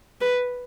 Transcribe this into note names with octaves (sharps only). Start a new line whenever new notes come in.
B4